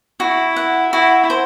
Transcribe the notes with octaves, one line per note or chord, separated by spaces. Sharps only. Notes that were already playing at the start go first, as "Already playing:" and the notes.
E4 F#4
F#5
E4 F#4
C5